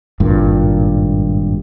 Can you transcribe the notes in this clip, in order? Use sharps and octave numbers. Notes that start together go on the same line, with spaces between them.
G#1 G2 A#2